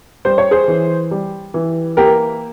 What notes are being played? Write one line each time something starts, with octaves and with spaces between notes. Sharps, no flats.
G3 C5
C#5
G#4 C5
E3
G3
E3
A#3 G4 A#4